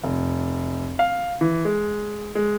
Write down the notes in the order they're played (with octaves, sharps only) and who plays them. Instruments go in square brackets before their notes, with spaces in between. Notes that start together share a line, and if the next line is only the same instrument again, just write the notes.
[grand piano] F1
F5
E3
G#3
G#3